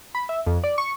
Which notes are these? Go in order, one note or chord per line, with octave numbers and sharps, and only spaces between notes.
B5
E5
F2
D5
C#6